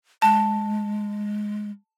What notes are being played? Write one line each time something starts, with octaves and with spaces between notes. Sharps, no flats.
G#3 A5